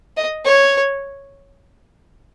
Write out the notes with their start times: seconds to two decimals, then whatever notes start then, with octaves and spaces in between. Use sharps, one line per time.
0.17 D#5
0.45 C#5